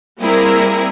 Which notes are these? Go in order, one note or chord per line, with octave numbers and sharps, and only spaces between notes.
G3 A#3 C4 E4 G#4 A#4